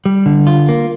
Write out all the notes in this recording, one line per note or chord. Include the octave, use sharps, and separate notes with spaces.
G3
D3
F4
A#3